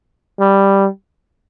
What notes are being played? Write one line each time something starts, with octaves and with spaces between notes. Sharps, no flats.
G3